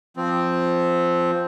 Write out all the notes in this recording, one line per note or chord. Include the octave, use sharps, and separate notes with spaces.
F3 C4